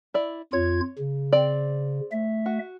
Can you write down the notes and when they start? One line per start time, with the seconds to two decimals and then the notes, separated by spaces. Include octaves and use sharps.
0.14 E4 D5
0.53 F2 F4 C#5 G#6
0.98 C#3
1.32 C4 D5 G5
2.12 A3 E5
2.46 F#4